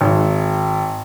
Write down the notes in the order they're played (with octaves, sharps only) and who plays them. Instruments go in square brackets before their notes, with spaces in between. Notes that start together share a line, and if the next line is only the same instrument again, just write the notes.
[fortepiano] G#1